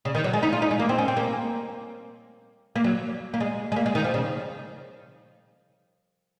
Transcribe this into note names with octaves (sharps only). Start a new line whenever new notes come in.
C#3
D#3
F#3
G#3
D#4
F4
D#4
G#3
A#3
C4
C#4
C4
A#3
A#3
F#3
A#3
G#3
G#3
A#3
G#3
D#3
F3
C#3